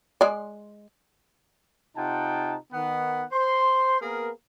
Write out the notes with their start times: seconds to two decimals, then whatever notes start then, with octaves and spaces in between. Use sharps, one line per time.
0.21 G#3 D5
1.97 C3 D#4 F4 F#5 G5 A5
2.72 D#3 B3 F#5
3.32 C5 C6
4.00 A#3 B3 G#4 A#4